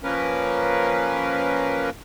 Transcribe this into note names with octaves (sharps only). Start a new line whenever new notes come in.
F3 A#3 C#4 A#4 B4